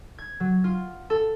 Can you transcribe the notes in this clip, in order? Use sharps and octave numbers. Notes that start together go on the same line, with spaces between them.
G#6
F#3
F4
A4